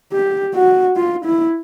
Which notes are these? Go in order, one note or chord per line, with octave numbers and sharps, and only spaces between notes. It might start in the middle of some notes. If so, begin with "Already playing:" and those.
G4
F#4
F4
E4